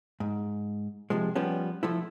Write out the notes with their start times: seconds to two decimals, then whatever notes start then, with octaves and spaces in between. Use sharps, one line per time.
0.20 G#2
1.10 C3 F3 G#3
1.35 F3 G3 B3 C#4
1.83 F3 A3 E4